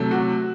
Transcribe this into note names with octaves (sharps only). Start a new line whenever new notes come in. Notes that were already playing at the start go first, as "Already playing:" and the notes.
Already playing: C3 F#3 A3
F#4